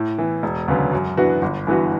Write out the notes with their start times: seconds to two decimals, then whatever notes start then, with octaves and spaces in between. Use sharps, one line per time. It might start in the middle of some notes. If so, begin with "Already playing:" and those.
Already playing: A2
0.18 E3 B3
0.43 E1
0.68 D2 C#3 F#3 B3
0.93 F#2
1.17 E3 B3 D4 F#4
1.42 G1
1.67 G2 E3 B3 F#4